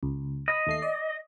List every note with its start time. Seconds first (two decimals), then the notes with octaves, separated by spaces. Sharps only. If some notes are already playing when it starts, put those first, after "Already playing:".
0.03 C#2
0.48 D#5 B5
0.67 D#2 A3 C7
0.82 D5